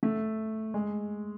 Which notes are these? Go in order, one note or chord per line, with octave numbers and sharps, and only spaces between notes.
A3
G#3